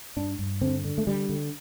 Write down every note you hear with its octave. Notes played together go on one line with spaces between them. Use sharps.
G2 D4
G2
D3 C4
D3
A3
D3 G3
D3